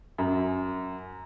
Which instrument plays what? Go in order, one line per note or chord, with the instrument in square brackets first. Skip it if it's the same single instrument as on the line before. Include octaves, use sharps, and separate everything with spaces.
[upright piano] F#2